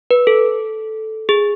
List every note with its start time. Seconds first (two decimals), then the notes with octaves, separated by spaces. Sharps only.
0.11 B4
0.27 A4
1.29 G#4